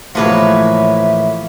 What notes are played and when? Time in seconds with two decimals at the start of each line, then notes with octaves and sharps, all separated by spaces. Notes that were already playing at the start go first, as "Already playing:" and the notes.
0.15 A2 E3 F3 A#3 F#4 B4 C#5 E5